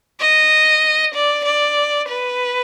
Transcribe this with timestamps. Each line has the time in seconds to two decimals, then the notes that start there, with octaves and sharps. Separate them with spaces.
0.20 D#5
1.14 D5
1.45 D5
2.08 B4